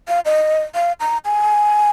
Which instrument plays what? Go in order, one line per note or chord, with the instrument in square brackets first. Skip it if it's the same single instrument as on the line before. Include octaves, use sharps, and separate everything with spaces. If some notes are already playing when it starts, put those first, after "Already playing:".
[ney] F5
D#5
F5
A#5
G#5